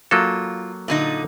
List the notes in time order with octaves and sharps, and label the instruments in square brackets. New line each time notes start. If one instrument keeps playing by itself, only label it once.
[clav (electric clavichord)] F#3 A#3 A4 [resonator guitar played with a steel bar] F4
[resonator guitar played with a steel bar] A#2 D3 D#4